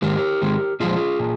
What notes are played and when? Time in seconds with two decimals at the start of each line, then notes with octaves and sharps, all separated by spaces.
0.02 G#2 D#3 G#3 G4 A#4
0.42 G#2 D#3 G#3
0.80 A#2 F3 G#3 F4 G#4
1.19 A#2